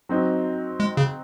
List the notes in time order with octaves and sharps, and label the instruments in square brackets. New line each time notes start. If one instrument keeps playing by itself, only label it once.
[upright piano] F#3 C4 D#4
[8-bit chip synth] G#3
C#3